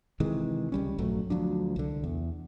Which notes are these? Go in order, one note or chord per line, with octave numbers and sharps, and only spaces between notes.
C3 D#3 E3 G#3
C#2 G3 C#4
A#1 G2 F#3 A3
D2 F3 F#3 D4
C2 D3
E2